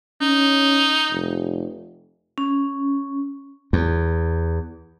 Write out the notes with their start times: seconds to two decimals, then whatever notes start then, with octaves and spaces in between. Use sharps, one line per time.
0.21 C#4 D#4
1.11 F1
2.38 C#4
3.73 E2